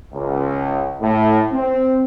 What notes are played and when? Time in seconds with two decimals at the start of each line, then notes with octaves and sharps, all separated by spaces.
0.14 C#2
1.01 A2
1.53 C4